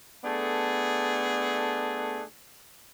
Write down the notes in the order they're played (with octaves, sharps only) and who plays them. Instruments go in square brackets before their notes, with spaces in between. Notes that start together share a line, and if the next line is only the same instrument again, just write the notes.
[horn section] A3 B3 D4 G#4 A4